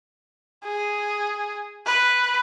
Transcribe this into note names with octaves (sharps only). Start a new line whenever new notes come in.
G#4
B4